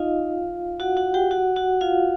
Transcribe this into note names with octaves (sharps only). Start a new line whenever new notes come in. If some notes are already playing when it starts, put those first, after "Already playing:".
Already playing: D#4 F4 D#5 F5
F#4 F#5
F#4 F#5
G4 G5
F#4 F#5
F#4 F#5
F4 F5